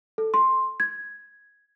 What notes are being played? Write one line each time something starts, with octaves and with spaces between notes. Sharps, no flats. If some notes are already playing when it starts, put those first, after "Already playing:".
A4
C6
G#6